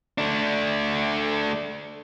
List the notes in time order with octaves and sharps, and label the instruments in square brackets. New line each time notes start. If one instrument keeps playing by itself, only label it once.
[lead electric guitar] A3 D4